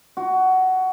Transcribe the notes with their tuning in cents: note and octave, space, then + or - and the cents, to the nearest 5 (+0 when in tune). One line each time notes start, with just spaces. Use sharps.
F#4 +15